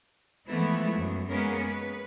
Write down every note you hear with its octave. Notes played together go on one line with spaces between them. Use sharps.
E3 F3 G#3 A3 B3 E4
F#2
G#3 A#3 B3 C#4 G#4 A#4
B4